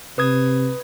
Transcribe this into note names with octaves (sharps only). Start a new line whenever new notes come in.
C3 B4 D#6 G#6